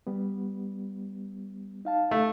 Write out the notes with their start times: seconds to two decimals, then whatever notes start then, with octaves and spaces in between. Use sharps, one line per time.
0.07 G3 B3
1.85 D#4 F5 A5
2.11 A3